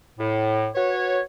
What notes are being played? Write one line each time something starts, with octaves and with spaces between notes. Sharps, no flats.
A2
F#4 B4 C#5